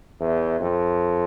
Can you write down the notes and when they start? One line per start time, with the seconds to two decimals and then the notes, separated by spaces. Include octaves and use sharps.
0.20 E2
0.60 F2